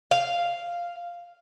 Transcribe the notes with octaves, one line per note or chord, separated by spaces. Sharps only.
F5